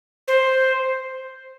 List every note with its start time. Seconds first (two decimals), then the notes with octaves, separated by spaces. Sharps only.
0.28 C5